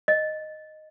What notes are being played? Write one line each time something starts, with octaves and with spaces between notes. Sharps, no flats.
D#5